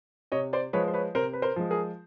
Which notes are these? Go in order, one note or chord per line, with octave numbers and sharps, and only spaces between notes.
C3 C#5 D#5
C5 D5
F3 G#3 B4 C#5
C5
B4 C#5
C3 A#4 C5
B4
A#4 C5
F3 G#3
G#4 A#4